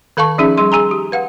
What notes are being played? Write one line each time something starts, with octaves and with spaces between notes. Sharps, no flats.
D#3 A4 F5 A5 C#6
F3 C#4 D#4 G#4 E5
G3 G#4 C6
G#4 G#5 A#5
G4
B4 F5 F#5